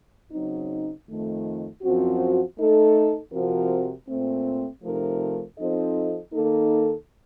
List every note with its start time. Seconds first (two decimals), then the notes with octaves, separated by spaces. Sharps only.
0.32 C#3 F#3 C4 D#4
1.07 F2 D#3 A3
1.82 F#2 F3 C4 F#4
2.57 A3 D#4 A4
3.33 C3 F3 C4 F#4 A#4
4.08 A#2 A3 C4
4.83 C3 F3 A3 D#4 A#4
5.58 F3 C4 D#4 A4 D#5
6.33 D#3 A#3 D#4 A4